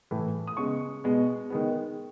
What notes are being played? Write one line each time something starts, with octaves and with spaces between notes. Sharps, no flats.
A2 E3 A3
D#6
C#3 G#3 B3 C#6
B2 G#3 B3
D#3 G#3 B3